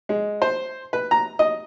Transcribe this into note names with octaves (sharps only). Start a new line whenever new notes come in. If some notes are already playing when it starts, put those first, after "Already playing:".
G#3
C5
B4
A#5
D#5